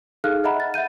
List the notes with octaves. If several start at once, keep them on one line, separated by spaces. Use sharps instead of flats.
D#4 G#4 A4 F5 F6 F#6
D#5 E5 F#5 A#5 B5
A6
E5 F#5 G6 D#7